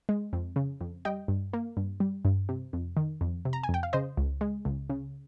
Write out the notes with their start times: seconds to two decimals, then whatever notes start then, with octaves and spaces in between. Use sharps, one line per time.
0.09 G#3
0.33 F2
0.56 C#3
0.81 F2
1.05 G3 D#5 G5
1.28 G2
1.53 A#3
1.77 G2
2.00 G3
2.25 G2
2.49 C3
2.73 F2
2.97 D#3
3.21 F2
3.45 C3
3.53 A#5
3.63 G#5
3.69 F2
3.74 G5
3.83 F5
3.93 C#3 C5 D#5
4.17 C#2
4.41 G#3
4.65 C#2
4.90 C#3